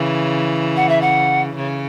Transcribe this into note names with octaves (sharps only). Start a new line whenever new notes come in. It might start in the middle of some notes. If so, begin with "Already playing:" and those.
Already playing: C#3 E3
F#5
E5
F#5
C#3